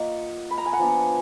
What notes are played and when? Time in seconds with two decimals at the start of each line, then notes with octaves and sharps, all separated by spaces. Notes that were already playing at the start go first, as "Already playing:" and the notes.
Already playing: A#3 F4 D#5 F#5
0.51 B5
0.58 A#5
0.66 G#5
0.73 F#5 A#5
0.79 F3 B3 D4